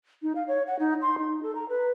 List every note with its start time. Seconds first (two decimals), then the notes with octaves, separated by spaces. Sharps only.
0.22 D#4
0.35 F5
0.48 C#5
0.67 F#5
0.79 D#4
1.02 C6
1.18 D#4
1.43 A4
1.55 A#5
1.69 B4